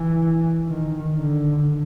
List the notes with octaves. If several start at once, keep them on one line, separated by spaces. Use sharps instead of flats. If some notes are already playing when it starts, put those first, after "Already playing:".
Already playing: E3
D#3
D3